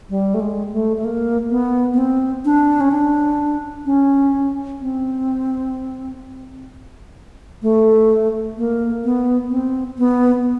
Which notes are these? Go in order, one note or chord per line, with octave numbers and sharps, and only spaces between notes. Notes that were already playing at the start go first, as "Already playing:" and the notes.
G3
A3
G#3
A3
A3
A#3
B3
B3
C4
D4
C#4
D4
C#4
C4
A3
A#3
B3
C4
B3